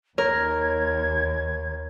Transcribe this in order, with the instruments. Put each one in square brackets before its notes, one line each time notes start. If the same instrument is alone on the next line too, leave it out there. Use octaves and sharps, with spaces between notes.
[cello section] D#2 [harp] A#4 [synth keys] C#5 [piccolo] G#6